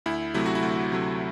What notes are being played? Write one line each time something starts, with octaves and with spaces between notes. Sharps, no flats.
D2 E4
C3 F#3 A3 E4
F#4
E4
D2
C3 F#3 A3